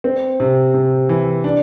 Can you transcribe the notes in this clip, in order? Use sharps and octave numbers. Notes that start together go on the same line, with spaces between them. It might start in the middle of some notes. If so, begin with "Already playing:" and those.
C4
C3
C3
E3
D4